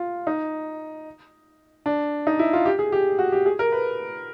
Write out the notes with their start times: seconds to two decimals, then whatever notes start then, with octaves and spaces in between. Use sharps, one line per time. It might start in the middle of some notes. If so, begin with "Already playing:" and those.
Already playing: F4
0.27 D#4
1.86 D4
2.27 D#4
2.39 E4
2.53 F4
2.66 G4
2.79 G#4
2.92 G4
3.19 F#4
3.32 G4
3.46 G#4
3.59 A#4
3.72 B4